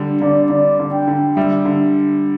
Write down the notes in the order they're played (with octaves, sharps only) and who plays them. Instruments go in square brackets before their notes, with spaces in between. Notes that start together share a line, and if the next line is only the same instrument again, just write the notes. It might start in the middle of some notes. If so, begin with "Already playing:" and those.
Already playing: [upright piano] D3 G3
[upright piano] D3 [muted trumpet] D5
[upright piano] D3 [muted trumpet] D5
[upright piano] D3
[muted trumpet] G5
[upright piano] D3
[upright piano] G3 [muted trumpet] E5
[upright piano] D3